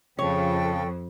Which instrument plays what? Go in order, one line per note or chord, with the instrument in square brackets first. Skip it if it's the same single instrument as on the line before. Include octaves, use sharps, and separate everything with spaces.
[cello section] F2 [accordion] C#3 F3 [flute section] A4 G5 [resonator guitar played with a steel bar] C#5